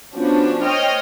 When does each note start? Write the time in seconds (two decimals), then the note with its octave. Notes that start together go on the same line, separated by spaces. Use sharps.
0.15 F3 B3 C#4 D4 F#4
0.64 C5 C#5 D#5 G5 F6